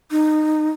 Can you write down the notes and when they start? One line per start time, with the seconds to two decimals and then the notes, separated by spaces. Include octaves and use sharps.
0.11 D#4